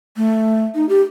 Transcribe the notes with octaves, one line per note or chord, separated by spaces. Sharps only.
A3
D#4
G4